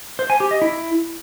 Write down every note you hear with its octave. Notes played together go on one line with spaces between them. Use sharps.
C5
G#5
G4
D#5
E4